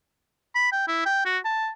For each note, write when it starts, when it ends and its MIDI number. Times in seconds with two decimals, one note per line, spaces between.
0.55 0.70 83
0.72 0.86 79
0.88 1.05 64
1.06 1.21 79
1.25 1.38 66
1.45 1.70 81